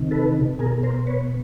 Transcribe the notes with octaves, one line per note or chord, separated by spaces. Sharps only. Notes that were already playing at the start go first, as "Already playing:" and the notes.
Already playing: C3 D#3
A4 B4
B2 G#4 A#4
A#4 C5
B4 C#5